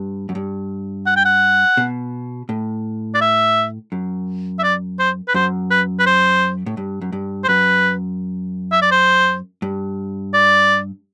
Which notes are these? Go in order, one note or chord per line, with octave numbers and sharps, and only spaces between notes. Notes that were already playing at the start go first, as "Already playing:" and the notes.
Already playing: G2
F#2
G2
F#5
G5
F#5
B2
A2
D5
E5
F#2
E5
D5
C5
B4
F#2 C5
B4
B4
C5
A2
G2
F#2
G2
C5
F#2 B4
E5
D5
C5
G2
D5